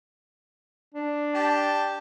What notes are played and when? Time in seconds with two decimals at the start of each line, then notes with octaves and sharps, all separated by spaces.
0.95 D4
1.35 G4 A5